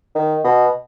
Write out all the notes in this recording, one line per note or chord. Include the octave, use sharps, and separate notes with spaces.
D#3
B2